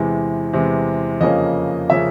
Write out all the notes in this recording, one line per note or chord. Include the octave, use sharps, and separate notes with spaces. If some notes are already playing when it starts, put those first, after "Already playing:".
Already playing: E2 C3 E3 G#3
E2 C3 E3 G#3
F2 C#3 F3 A#3 C#4 D#5
C#3 F3 A#3 C#4 E5